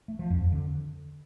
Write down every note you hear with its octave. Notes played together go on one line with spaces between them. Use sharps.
A3
F3
F2
F2
D3